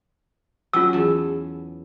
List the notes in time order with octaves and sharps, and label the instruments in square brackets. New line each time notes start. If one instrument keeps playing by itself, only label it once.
[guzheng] F#3 C#4 [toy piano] F4 E6
[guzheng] E2 A5